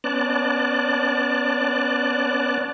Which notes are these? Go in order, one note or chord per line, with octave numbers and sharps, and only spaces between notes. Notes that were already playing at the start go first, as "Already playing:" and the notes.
B3 C#4 D5 A5 F#6